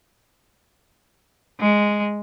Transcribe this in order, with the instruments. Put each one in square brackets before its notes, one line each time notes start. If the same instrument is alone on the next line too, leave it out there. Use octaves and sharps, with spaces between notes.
[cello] G#3